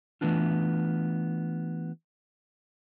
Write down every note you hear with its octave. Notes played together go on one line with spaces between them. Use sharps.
E3 G3 A3 B3 D4 F4